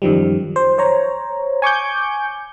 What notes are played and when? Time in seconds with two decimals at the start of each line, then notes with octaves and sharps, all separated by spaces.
0.02 F#2 D#3 F3 G3
0.56 C5
0.78 C5 C#5 A#5
1.62 G#5 C#6 D6 G6